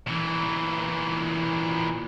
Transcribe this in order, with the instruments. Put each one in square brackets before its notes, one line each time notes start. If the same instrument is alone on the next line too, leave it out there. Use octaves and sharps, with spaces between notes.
[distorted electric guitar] A#2 E3